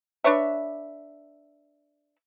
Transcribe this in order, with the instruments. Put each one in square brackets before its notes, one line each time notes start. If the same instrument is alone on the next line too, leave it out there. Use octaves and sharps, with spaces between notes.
[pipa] D4 B4 C#5 E5